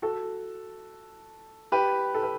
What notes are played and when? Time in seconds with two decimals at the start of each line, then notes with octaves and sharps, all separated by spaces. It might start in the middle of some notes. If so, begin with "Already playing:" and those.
0.02 F#4 A4
1.72 G4 B4
2.14 A4
2.23 B4